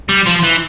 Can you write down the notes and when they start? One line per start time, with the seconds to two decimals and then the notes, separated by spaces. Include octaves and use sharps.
0.09 G3
0.26 F3
0.43 E3